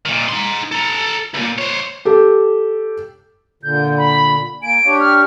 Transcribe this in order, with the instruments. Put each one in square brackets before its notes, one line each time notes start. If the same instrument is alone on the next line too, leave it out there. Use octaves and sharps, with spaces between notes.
[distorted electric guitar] A#2 D#3
D#4 C6
A4 A#5
C#2 A#2
C5 C#5
[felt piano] G4 A4
[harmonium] A#2 D3 [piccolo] G6
[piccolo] B5
[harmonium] A#3 G#5 [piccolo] D7
[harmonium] D4 G4 C#5
[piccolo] F6